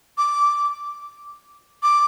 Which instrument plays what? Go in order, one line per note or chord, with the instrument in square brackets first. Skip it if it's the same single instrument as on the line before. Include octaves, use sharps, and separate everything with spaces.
[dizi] D6
D6